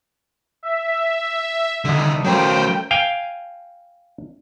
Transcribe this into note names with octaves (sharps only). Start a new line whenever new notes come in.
E5
C2 D3 D#3 D#5
F#3 A3 C#4 A#4 C5 G5
F5 G5 G#5